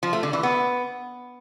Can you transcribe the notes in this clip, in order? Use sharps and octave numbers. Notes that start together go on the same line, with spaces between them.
F3
A3
D3
E3
B3